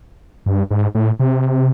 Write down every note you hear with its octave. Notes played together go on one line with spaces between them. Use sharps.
G2
G#2
A2
C3